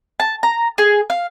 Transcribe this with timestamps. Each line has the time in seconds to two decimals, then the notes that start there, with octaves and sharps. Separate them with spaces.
0.20 A5
0.43 A#5
0.78 G#4
1.10 F5